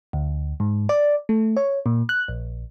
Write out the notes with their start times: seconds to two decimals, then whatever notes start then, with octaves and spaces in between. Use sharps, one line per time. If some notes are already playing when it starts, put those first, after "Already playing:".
0.13 D2
0.60 G#2
0.89 D5
1.29 A3
1.57 C#5
1.86 A#2
2.09 F#6
2.28 A#1